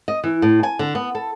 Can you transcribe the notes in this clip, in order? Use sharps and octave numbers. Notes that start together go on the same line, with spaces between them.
D#5
E3
A2
G#5
D3
B3
A4